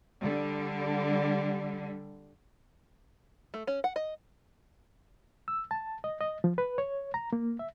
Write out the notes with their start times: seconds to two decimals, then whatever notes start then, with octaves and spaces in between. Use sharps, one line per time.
0.21 D3 G3
3.54 A3
3.67 C#4
3.84 F#5
3.96 D#5
5.48 E6
5.71 A5
6.04 D#5
6.21 D#5
6.44 F3
6.58 B4
6.78 C#5
7.14 A#5
7.33 A#3
7.59 E5